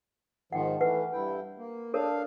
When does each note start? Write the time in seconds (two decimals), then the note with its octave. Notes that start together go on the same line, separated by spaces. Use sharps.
0.53 G#2 D#3 F3 F#5 G5
0.81 E3 A3 B4 F#5
1.13 G2 E4 G5
1.58 A#3
1.94 D4 A4 A#4 C#5 F5